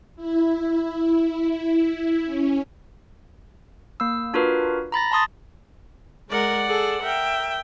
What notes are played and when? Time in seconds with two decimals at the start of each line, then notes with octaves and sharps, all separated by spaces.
0.16 E4
2.25 C#4
4.00 A#3 E6
4.34 D4 F4 F#4 A#4 B4
4.92 A#5 B5 A6 A#6
5.12 A5 C6 D#6 A6
6.29 G#3 A#4 D5 F#5
6.67 G#4 A4
7.03 A#4 E5 G5